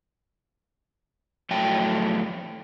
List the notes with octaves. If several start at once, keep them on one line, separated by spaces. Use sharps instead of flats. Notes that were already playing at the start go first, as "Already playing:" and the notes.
F2 A2 F#3 A3 G5 A5